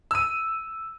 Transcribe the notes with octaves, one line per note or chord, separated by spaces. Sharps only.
E6 D#7